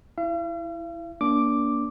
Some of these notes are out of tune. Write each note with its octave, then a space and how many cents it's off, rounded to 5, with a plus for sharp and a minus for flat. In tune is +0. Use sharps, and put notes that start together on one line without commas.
E4 +0 F5 -45
A#3 +15 D4 -25 D6 +0